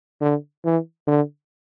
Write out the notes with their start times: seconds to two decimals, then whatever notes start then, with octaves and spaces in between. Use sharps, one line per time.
0.21 D3
0.64 E3
1.07 D3